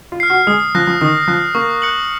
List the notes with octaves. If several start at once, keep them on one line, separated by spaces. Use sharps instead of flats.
F4
F6 C7
F#4
G#3 D#6
F3 F#6 A#6
F3
D#3 D#6
F3 F#6 A#6
A#3 C#6
F#6 C#7 F#7